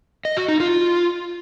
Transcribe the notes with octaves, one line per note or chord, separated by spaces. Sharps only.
D#5
F#4
D#4
F4